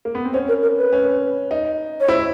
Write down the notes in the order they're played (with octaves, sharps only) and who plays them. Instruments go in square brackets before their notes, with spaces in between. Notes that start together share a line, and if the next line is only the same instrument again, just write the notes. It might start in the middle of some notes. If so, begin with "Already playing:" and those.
[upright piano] A#3
B3
C4
[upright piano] C#4 [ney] C5
[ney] A#4
A#4
B4
[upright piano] C#4
D#4
[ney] C#5
[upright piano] E4 [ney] C5